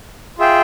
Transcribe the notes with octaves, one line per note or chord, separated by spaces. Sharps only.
F4 G#4 E5 G5